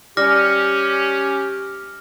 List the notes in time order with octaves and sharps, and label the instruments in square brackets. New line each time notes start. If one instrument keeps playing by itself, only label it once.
[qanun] G3 G5 [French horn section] C#4 [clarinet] G4 [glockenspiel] D6 F6 A#6